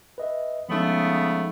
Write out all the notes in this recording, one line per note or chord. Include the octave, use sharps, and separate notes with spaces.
B4 D#5 E5
C#3 F3 G#3 A3 B3 D#4